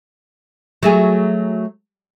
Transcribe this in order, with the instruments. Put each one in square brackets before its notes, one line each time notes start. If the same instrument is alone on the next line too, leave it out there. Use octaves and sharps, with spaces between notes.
[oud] F#3 A3 G#4